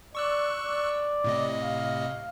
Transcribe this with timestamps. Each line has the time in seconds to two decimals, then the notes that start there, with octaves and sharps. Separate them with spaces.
0.15 D5 C#6 E6 F#6
0.64 D5
1.24 A2 C3 D#5
1.62 F5